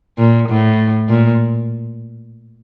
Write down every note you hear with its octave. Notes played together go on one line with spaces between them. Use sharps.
A#2
A2
A#2